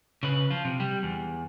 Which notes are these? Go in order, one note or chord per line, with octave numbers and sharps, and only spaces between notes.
C#3 B4
F3 F4
C3
G3
E2